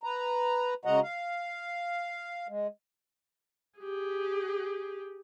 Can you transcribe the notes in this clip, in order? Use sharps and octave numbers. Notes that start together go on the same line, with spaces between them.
B4 A#5
C#3 G#3 F#4 D#5 F#5 A#5
F5
G#3
G4 G#4